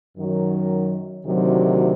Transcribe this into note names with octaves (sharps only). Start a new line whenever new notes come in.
F#2 D#3 F#3
D2 C3 D#3 F#3